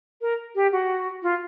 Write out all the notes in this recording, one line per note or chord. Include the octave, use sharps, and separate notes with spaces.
A#4
G4
F#4
F4